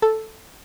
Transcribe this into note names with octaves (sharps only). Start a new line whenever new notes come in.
A4